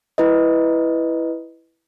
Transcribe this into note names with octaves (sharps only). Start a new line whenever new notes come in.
E4 B4 D#5